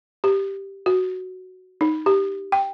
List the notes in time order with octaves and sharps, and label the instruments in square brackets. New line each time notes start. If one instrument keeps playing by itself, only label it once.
[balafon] G4
F#4
D#4
G4
G5